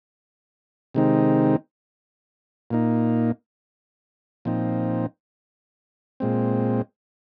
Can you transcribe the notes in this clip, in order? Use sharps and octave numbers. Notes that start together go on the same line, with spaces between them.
C3 D#3 G#3 C4 D#4
A#2 A#3 D#4
A#2 F3 C4 D#4
A#2 G#3 C4